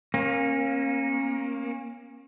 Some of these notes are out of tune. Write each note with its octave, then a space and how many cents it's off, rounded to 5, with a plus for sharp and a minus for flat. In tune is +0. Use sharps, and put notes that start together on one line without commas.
A#3 +10 C#4 -30